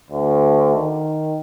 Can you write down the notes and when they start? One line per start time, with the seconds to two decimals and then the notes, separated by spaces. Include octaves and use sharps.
0.10 D2
0.75 D#3